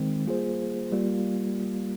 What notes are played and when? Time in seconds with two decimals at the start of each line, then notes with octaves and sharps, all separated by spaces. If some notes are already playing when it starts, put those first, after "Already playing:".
Already playing: D#3 G#3 C4
0.25 G3 A#3 F4 G#4 C5
0.92 G3 A#3 F4